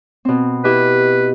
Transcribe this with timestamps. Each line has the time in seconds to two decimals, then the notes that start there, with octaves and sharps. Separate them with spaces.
0.25 B2 C4
0.64 E4 G4 B4 D#5